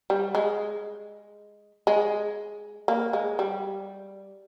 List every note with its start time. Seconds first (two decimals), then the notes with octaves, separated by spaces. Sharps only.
0.10 G3
0.35 G#3
1.87 G#3
2.88 A#3
3.13 G#3
3.39 G3